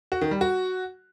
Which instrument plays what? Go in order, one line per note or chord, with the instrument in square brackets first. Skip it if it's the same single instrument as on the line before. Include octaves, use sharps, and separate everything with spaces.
[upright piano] F#4
D#3
G3
F#4